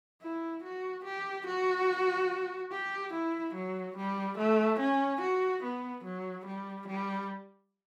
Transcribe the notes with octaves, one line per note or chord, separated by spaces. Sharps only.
E4
F#4
G4
F#4
G4
E4
F#3
G3
A3
C#4
F#4
B3
F#3
G3
G3